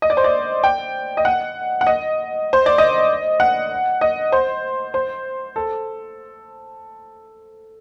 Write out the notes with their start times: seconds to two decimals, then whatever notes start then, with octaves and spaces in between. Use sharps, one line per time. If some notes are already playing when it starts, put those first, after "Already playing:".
0.02 D#5
0.10 D5
0.17 C5
0.24 D5
0.64 G5
1.17 D#5
1.25 F#5
1.81 F#5
1.87 D#5
2.53 C5
2.66 D5
2.78 D#5
3.40 F#5
4.01 D#5
4.32 C5
4.94 C5
5.56 A4